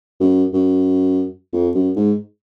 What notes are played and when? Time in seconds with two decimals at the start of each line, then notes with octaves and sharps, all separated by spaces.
0.20 F#2
0.53 F#2
1.53 F2
1.74 F#2
1.96 G#2